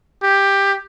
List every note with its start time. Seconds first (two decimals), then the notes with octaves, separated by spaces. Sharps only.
0.22 G4